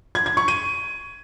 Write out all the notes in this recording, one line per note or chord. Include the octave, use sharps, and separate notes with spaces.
G#6
G#6
C#6
D#7